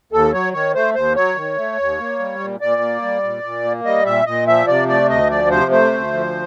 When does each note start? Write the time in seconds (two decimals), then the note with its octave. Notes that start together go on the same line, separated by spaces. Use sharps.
0.12 D#2 A4
0.33 F#3 C#5
0.53 D#3 C#5
0.75 A3 C5
0.95 D#2 C5
1.16 F#3 C#5
1.36 D#3
1.57 A3
1.79 D#2
1.98 A#3
2.19 G3
2.40 A#2
2.61 A#2 D5
2.81 A#3
3.02 G3
3.23 A#2
3.44 A#2
3.64 A#3
3.85 G3 D#5
4.05 A#2 E5
4.26 A#2 D#5
4.47 F3 E5
4.67 C3 D5
4.88 A3 D5
5.09 D2 D#5
5.30 F3 D5
5.51 C3 C5
5.71 A3 C5
5.92 D2
6.13 F3